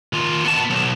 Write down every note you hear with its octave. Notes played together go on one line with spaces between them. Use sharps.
D#3 F4
B3 A5
B1